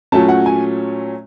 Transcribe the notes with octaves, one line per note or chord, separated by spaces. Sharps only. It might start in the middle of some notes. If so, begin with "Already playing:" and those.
A#2 F#3 A3 C#4 A5
F#5
G#5